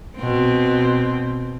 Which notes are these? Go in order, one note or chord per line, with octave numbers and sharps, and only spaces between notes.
B2 C4